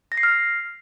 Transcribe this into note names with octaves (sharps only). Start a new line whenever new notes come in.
A#6
C7
F6